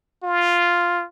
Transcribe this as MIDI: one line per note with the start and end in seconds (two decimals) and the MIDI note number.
0.23 1.04 65